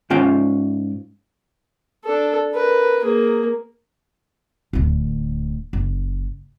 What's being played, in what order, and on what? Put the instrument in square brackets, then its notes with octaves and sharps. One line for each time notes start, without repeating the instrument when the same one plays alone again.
[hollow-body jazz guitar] G#2 C#4 F4 G5
[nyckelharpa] D4 A4
A#4 B4
A#3 G#4
[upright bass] D1 D2
F#1